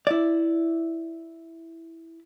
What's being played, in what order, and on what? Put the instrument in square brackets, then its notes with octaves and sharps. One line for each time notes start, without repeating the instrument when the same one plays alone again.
[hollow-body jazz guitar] E4 D5